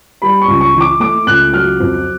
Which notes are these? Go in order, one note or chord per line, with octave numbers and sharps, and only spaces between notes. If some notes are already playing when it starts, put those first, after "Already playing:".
G3 B5
C#6
C#2
C#6
E3
D6
A3 D6
C#2 F#6
F#3 F6
F2